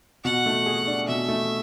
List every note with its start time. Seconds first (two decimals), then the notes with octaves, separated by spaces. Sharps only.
0.24 B2 F#5
0.46 A3
0.66 G#4
0.87 D4
1.08 B2 E5
1.28 A3